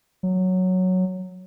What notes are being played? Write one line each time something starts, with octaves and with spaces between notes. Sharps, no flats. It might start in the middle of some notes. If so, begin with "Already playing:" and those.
F#3